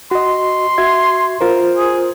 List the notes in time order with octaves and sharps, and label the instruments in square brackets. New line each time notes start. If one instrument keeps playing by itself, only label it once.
[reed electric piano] F#4 D#5 [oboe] C6
[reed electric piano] F#4 E5 G#6
F4 A#4 C5
[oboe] G#4